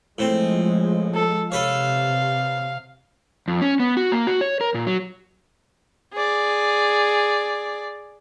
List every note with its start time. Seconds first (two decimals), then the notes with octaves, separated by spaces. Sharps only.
0.18 A2 F3 G#3 C4
1.15 A4
1.52 C3 A4 B4 C#5 F5
3.48 F2
3.62 C#4
3.80 B3
3.97 F#4
4.12 A#3
4.27 F#4
4.41 C#5
4.61 A#4
4.74 A#2
4.87 F#3
6.13 G#4 D5